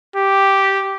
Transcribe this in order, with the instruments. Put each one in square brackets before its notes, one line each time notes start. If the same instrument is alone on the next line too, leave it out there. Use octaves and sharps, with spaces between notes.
[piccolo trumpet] G4